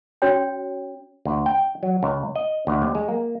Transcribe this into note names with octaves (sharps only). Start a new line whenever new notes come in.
C#4 F#4 C#5 G5
D2
G5
F#3
C#2
D#5
D2
D#2
G#3
A#3